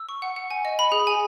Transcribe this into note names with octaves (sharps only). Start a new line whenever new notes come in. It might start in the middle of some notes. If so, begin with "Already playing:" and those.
Already playing: E6
C#6
F#5
F#5
G#5
D#5
B5
G#4
G#5